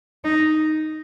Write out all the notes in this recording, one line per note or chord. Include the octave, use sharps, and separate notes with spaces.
D#4